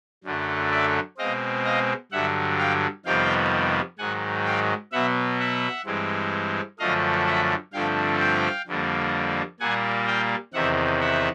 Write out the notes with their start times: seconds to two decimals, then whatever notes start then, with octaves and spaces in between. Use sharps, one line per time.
0.24 F#2 D3 F#3 A3
0.71 D5 E5
1.18 B2 G#3 C4 D#5 F5
1.65 D#5 F5
2.12 G2 D3 F#3 E5 F#5
2.59 F5 G5
3.05 F2 C3 D#3 G3 B3 F5 G5
3.98 G#2 D#3 F#3 F#5 G#5
4.45 F5 G5
4.92 B2 F#3 B3 E5 F#5
5.39 E5 F#5
5.86 G2 E3 G#3 C4
6.79 F#2 D3 F3 A3 D#5 F5
7.27 E5 F#5
7.73 G2 D3 F3 A3 C4 F5 G5
8.20 F5 G5
8.67 F2 D3 G3 A#3
9.60 A#2 G3 A#3 F#5 G#5
10.07 F5 G5
10.54 E2 C3 D#3 E5 F#5
11.01 E5 F#5